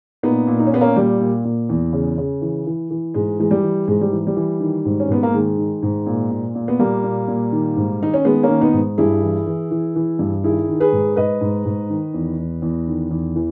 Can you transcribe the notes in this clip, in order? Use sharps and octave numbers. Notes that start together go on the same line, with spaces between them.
A#2 B3 D#4
A#2
D#4
C#4
A#2 B3
A#3 C#4
A#2 G3
A#2
A#2
E2
C#3
C#3
E3
E3
E3
G#2 G#3
E3 G#3
G3
E3
G#2 G#3
G3
E3
G3
E3
D#3
G#2
C#4
G#2 B3
A#3
D#3 G#3
D#3
G#2
A#2
A#2
A#2
B3
A#2 G3 A#3
A#2
A#2
D#3
G#2
D#3 D#4
C#4
D#3 G#3 B3
A#3 C#4
D#3
B3 D#4
G#2
G2 E4 G#4
E3
E3
E3
E3
G2
D#3 E4 G#4
D#3
G#4 B4
G#2
G#2 B4 D#5
G#2
G#2
D#3
E2
E2
E2
D#3
E2
E3